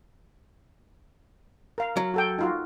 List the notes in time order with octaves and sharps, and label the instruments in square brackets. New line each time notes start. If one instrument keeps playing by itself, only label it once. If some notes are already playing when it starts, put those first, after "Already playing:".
[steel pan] A#4 F5
[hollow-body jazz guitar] F#3
[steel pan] F#4 A4 G5
D#4 F4 F#4